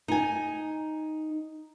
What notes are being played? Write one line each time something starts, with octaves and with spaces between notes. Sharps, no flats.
D#4 G#5